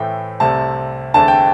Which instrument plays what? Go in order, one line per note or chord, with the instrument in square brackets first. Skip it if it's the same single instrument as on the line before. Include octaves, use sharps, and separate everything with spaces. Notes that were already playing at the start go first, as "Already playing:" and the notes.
Already playing: [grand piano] A2 E3 A3 C4 G5
C2 C3 A3 C4 A5
E2 D3 A3 C4 A5
G5